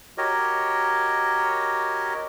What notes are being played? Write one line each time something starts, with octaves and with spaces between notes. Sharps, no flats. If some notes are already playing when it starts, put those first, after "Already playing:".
F#4 G4 A#4 C#5 D#5